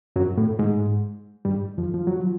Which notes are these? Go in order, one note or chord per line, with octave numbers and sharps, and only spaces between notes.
F#2 F#3
A2 A3
G#2 G#3
G2 G3
F2 F3
F3
F#3
F3